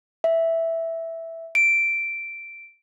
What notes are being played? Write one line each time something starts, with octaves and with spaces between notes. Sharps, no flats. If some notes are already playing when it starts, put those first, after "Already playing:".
E5
D7